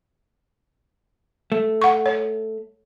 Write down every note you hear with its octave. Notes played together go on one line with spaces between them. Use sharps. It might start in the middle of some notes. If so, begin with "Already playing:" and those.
A3
F#5 C#6
C#5